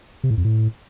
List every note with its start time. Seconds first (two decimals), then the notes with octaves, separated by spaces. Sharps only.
0.24 C3
0.31 A2
0.37 F2
0.44 A2